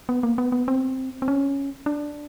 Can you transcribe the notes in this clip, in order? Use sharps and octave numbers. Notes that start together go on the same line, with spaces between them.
B3
A#3
B3
B3
C4
C4
C#4
D4